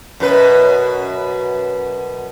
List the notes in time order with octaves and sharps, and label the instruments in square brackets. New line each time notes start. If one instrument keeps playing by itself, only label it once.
[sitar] F#2 B2 B4